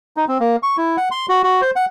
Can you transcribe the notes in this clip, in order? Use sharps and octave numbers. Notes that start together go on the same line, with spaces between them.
D#4
C4
A#3
C#6
E4
F#5
C6
F#4
F#4
C5
F#5